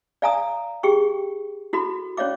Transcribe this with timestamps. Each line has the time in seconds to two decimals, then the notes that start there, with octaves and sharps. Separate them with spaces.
0.22 D5 F5 G#5 A#5 D#6
0.83 G4 G#4 G5 C#6
1.73 E4 F#4 A4 B5
2.17 C#4 C#5 D5 F5 D6